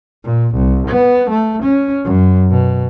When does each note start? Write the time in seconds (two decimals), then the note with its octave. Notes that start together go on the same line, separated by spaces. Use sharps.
0.24 A#2
0.54 C2
0.88 B3
1.30 A3
1.63 C#4
2.04 F#2
2.50 B2